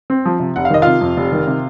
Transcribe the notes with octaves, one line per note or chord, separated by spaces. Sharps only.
C4
F3
C3
F1 F#5
F5
D#3 D#5
C3 F4 F5
F2
F1
D#3
C3